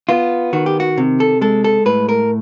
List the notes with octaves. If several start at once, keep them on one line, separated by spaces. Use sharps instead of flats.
B3 F4
D#3 F#4
G4
F#4
C3
A4
G#3 A4
A4
A2 B4
A#4